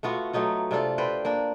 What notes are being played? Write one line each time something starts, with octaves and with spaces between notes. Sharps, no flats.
A3 B3 F4 F#4
F#3 A3 D#4 F4
C3 D4 F4 A4
B4 C5 D5 G5
A#3 D4